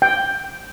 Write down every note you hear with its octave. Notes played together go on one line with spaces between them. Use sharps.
G5